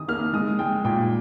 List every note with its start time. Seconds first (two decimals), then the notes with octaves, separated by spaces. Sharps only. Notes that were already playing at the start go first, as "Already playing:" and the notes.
Already playing: D#3 D#6
0.08 A#3 F6
0.33 G#3 D#6
0.59 G#3 G5
0.85 A#2 G5